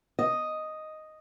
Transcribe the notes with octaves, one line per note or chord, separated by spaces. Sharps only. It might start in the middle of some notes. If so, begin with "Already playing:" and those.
D#5